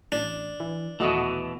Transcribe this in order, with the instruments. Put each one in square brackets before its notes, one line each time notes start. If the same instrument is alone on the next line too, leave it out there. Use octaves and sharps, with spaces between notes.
[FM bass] A1 [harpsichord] D4
[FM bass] E3
[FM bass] D#1 [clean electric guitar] B2 E3 [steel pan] A3 F#4 D#5